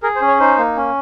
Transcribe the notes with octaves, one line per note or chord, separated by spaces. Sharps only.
G#4 A#4
C5
C#4
C#5
D#4 C5
A#3
C#4